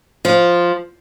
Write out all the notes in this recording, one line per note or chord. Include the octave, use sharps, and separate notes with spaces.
F3